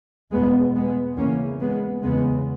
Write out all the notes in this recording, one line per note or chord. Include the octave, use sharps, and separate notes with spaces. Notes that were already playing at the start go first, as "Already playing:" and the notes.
E2 B2 G#3 B3
G#3 B3
E2 C#3 A#3 C#4
G#3 B3
E2 C#3 G#3 B3